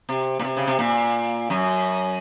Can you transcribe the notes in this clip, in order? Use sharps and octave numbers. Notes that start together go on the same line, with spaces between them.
C3
A#2
C3
C#3
C3
A#2
F#2